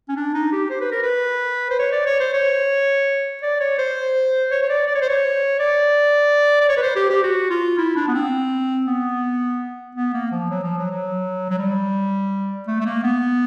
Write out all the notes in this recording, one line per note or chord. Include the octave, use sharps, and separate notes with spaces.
C#4
D4
D#4
G4
C5
B4
A#4
B4
C5
C#5
D5
C#5
C5
C#5
D5
C#5
C5
C#5
C#5
D5
D5
C#5
C5
C#5
D5
D5
C#5
B4
C5
G4
G4
F#4
F4
E4
D4
B3
C4
B3
B3
A#3
F3
F#3
F3
F#3
F#3
F#3
G3
A3
A3
A#3
B3